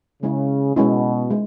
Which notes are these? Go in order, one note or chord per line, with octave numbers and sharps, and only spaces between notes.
C#3 G#3 C#4 E4
B2 G#3 C#4 E4
G#3